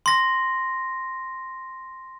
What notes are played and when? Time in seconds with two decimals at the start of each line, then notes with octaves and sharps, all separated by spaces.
0.06 C6 A#6